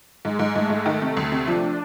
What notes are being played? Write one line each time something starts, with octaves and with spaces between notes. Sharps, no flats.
G#2 G#3
G#2
G#2 A3
G#2
D#3
C3
D2
C3
F3 D4